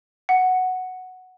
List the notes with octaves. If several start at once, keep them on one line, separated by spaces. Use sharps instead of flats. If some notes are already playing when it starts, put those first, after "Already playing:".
F#5